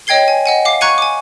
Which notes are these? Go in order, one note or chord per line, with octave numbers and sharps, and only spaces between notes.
C#5 D#5 G5 G#6 C7 G7
G#5
D#5 F#5 G#5
F5 D6 C7
A#5 C#6 F#6 G#6 C#7 D#7
G#5 D6